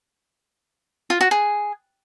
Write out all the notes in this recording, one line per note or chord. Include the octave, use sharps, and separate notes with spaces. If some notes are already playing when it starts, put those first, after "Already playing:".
F4
F#4
G#4